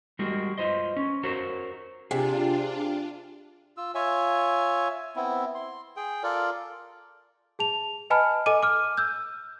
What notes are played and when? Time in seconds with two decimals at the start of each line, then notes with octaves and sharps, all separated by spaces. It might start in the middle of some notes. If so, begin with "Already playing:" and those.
0.19 G3 G#3 F#4 G#4 A#4
0.58 F4 B4 C5 D#5
0.96 C#4
1.23 F#4 A#4 C5 C#5
2.11 C3 D4 F4 G#4
3.77 F4 E6
3.95 F4 C#5 E5 G#5
5.16 B3 C4 E4
5.55 C6
5.97 G#4 G5
6.23 F4 A4 A#4 D5
7.59 G#4 A5 F7
8.10 B4 D#5 G#5 A5 B5 F6
8.46 A4 D#5 G#5 D6 D#7
8.63 D6 F6
8.97 E6 G6